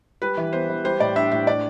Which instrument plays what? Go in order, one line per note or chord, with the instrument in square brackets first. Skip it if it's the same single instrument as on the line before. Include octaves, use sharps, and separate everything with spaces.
[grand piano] G3 [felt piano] B4
[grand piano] E3
[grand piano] B3 [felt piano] C5
[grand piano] E3
[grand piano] G3 [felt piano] C5
[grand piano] A2 [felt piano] D5
[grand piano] D4 [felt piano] E5
[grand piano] A2 [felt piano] E5
[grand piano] D4 [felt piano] D5